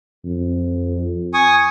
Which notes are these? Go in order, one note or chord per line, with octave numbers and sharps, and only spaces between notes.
F2
G#5 C#6 D#6